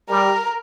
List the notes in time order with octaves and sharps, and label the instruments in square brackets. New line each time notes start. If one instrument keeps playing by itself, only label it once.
[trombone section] G3 [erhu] A#4